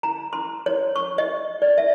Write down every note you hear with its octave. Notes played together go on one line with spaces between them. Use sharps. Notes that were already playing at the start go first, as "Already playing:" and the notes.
A#5
C6
C#5
C#6
D#5
D5
E5